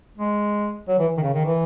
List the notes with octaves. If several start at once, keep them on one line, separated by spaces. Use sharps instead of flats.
G#3
F#3
E3
D#3
C#3
D#3
E3